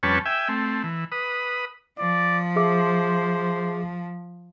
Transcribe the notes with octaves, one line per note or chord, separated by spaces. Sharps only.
F2 G3 C#4 B4 C#5 A5
E5 G5 G#5
A3 C4
E3
B4 D#6
F3 D5
G#4 C5 E5 D6